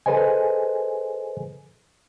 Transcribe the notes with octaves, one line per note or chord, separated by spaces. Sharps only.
G#4 A4 B4 C5 D#5 G#5